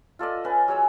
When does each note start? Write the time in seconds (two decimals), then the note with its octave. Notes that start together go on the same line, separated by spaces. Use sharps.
0.19 F4 A4 D5 D#5
0.44 C#4 B4 G#5
0.68 F#3 G#4 C#5 E6